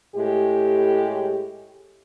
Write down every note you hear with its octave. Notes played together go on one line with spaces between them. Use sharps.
A2 G#3 G4